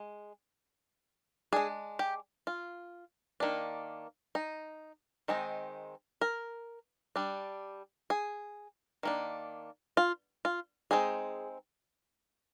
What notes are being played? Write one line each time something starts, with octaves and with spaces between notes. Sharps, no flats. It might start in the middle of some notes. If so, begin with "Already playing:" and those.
Already playing: G#3
G#3 D4 G#4
G4
F4
D#3 A#3 D4
D#4
D#3 G#3 C4 D#4
A#4
G3 D4
G#4
D#3 A#3 D4
F4
F4
G#3 C4 D#4 G#4